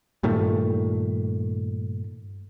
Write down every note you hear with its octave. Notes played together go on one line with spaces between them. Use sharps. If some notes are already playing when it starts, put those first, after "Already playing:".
G2 A#2 D#3 A3